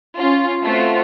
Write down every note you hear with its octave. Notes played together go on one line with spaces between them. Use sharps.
C#4 F4
A3 C4 F4 F#4